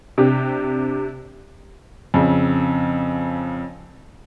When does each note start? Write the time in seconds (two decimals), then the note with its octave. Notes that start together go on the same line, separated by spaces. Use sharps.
0.18 C3 D4 G4
2.14 F2 C#3